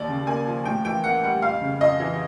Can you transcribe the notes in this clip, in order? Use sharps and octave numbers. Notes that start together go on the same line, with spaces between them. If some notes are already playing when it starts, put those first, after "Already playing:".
Already playing: D#2 D5
C#3
A#3 G#5
F3
A2 G5
E3 G5
A#3 F#5
G3 F#5
F2 F5
C#3
F2 D#5
E3